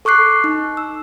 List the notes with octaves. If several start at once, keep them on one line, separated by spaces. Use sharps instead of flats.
A4 C#6 D6 F#6 C7
D#4
E6